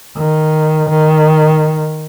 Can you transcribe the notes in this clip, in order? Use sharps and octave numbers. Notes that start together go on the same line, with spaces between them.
D#3
D#3